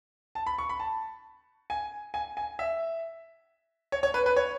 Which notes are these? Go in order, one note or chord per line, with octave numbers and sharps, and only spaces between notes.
A5
B5
C#6
B5
A5
G#5
G#5
G#5
E5
C#5
C#5
B4
B4
C#5